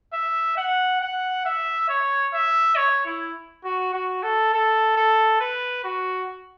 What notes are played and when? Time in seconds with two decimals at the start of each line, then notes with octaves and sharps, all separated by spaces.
0.13 E5
0.57 F#5
1.01 F#5
1.45 E5
1.89 C#5
2.33 E5
2.76 C#5
3.06 E4
3.64 F#4
3.94 F#4
4.23 A4
4.53 A4
4.97 A4
5.40 B4
5.84 F#4